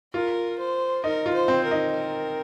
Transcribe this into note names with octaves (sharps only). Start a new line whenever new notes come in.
F4 A#4
C5
D#4 A#4
F4
C5
C4
A#4
D#4
A#4